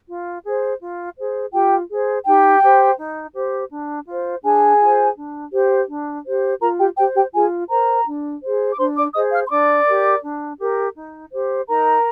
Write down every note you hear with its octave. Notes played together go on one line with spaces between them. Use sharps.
F4
G#4 C5
F4
G#4 C5
F4 G4 G5
G#4 C5
D#4 G4 G5
G4 C5
D#4
G4 C5
D4
F4 C5
D4 G#4 G#5
F4 C5
D4
G4 C5
D4
G4 C5
F4 A#4 A#5
G4 G5
G4 C5 G5
G4 G5
F4 G#4 G#5
A#4 C5 A#5
D4
G#4 C5
D6
D4 C5 C6
D5 D6
G#4 C5 D#5 D#6
F5 F6
C6
D4 D5 D6
G4 A#4
D4
G4 A#4
D#4
G4 C5
D#4 A#4 A#5